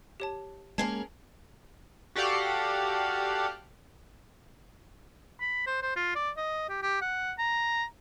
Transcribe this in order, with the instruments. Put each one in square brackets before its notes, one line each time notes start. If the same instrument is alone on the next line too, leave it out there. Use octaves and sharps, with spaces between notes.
[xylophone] G4 C#5 A5
[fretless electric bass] G#3 A#3 [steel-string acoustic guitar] C#4 G#4 A#4 [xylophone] A5 G#6 C7
[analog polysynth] F#4 G4 A4 D5 F5 F#5
[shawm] B5
C5
C5
F4
D5
D#5
G4
G4
F#5
A#5